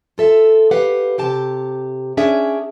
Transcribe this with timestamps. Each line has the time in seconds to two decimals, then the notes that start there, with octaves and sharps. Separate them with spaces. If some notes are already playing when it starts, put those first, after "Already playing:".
0.18 F4 A4 E5
0.71 G4 B4 F5 F#5
1.18 C3 G4 A5
2.17 C#4 D4 G#4 E5